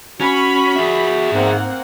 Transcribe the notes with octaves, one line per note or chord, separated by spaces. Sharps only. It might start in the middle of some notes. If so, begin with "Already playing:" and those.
C#4 F#4 B5
G#4 E5
G#2 A#3 C4 F#5